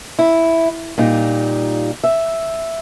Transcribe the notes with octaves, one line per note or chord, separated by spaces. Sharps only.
E4
A#2 G3 D#4
E5